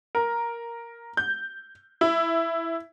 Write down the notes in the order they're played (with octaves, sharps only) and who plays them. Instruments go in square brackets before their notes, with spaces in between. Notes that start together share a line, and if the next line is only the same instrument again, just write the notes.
[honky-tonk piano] A#4
G6
E4